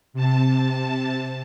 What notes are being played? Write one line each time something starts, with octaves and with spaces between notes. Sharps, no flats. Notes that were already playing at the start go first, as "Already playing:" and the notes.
C3 A5